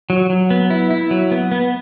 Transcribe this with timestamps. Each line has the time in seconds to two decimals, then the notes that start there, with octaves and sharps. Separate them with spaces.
0.10 F#3
0.30 F#3
0.50 B3
0.70 E4
0.91 E4
1.11 F#3
1.31 B3
1.52 B3